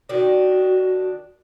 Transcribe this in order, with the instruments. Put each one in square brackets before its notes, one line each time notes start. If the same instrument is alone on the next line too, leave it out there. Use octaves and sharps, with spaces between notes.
[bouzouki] D#3 D4 [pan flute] F#4